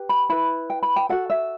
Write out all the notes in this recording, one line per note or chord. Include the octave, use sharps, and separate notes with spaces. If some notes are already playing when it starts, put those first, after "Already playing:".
Already playing: G4 B4
B5
E4 B4 B5
G5
B5
G5
F#4 A4 F#5
E5